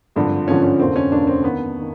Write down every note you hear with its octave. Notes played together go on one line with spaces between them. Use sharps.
G#1 G2 D3 F3
G#1 G2 D3 F3 C#4
C#4
F1 D#2 D3 C4
C#4
F1 D#2 D3 D4
C4
D#2 D#3 B3
D#3